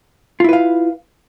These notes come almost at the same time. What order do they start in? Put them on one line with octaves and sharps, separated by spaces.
F4 E4 B4 F5